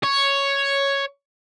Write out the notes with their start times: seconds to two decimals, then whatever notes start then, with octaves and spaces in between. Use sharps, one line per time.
0.04 C#5